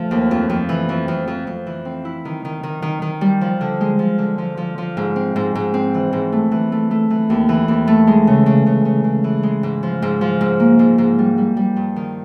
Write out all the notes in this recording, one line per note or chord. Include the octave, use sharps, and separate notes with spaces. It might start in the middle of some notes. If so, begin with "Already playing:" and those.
Already playing: F3 A3
D#2
F2
F2
E3
F2
F2
F2
F2
E3
C4
E4
D#3
D#3
D#3
D#3
D#3
G3
F3
D3
G#3
F3
D3
F3
F3
F3
G#2
C4
G#2
G#2
C4
E3
G#2
A3
E3
A3
A3
E3
D#2
E3
D#2
A3
G#3
C#3
C#3
C#3
C#3
C#3
E3
G#3
G#2
F3
G#2
F3
G#2
A#3
G#2
G#2
G3
G3
G3
G2
D#3